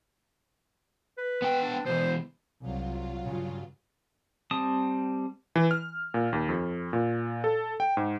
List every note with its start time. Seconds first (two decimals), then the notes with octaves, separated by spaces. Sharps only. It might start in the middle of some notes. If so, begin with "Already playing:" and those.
1.18 B4
1.42 B3 G5
1.62 D4
1.86 B2 E3 C5
2.62 C2 F#3 F4
3.25 G2 C#3
4.51 G3 C4 A5 D#6
5.56 E3
5.71 F6
6.14 A#2
6.33 D#2
6.49 F2
6.93 A#2
7.44 A4
7.80 G5
7.97 G#2